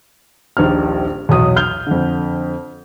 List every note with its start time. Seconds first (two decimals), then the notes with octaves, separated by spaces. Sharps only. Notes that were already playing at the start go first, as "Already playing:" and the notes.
0.57 D#1 A#1 D4 D#4 F6
1.29 B1 E2 F#3 D#6
1.56 F6 G6 G7
1.87 F2 D3